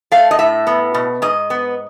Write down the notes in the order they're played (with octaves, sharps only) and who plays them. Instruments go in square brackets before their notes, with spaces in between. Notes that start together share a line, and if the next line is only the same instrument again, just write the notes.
[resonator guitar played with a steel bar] A3 F5
D#5
A2 E5
B3
B2
G#2 D#5
B3